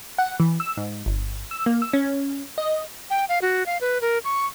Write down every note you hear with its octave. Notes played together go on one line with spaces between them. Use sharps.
F#5
E3
E6
G#2
G1
E6
A#3
E6
C#4
D#5
G5
F5
F#4
F5
B4
A#4
C#6